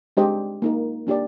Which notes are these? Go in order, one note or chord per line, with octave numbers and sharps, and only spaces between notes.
G#3 D4 G4 C5 D#5
A#3 D#4 A#4
A#3 D4 G4 D5